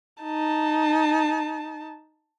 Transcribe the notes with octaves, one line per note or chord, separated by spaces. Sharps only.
D#4 A5